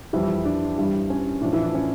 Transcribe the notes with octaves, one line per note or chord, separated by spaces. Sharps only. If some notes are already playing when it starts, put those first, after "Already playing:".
F2 E3 G3 E4
D4
G2 E3 G3
C#4
A2 F3 D4
E3 E4
D4
C#4